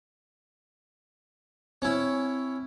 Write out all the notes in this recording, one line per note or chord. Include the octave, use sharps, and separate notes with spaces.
C4 C#4 E4